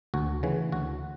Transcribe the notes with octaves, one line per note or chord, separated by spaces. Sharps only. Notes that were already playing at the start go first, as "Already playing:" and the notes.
D2 F#4
C#3 E3
D2 F#4